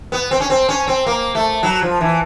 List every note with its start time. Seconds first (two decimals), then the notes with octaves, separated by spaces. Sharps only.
0.12 B3
0.31 C4
0.40 C#4
0.50 C4
0.69 C#4
0.88 C4
1.06 A#3
1.35 A3
1.63 F#3
1.82 F3
2.01 E3